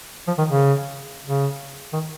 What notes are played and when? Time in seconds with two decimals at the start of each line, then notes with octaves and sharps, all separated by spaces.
0.27 F3
0.38 D#3
0.50 C#3
1.26 C#3
1.93 D#3